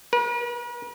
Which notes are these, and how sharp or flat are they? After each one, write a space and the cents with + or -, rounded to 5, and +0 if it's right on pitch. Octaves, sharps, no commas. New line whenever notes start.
B4 -45